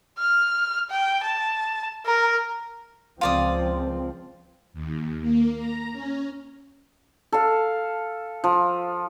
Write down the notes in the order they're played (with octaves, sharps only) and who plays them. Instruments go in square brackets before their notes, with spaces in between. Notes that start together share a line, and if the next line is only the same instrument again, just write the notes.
[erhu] F6
G5
A5
A#4
[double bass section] C#2 F3 C4 [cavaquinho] F4 D5 D#6
[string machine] D#2
A#3
A#5
C#4
[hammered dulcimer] A4 F5
F3